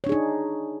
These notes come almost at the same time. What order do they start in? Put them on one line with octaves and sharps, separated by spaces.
C#5 D4 G#4 D#4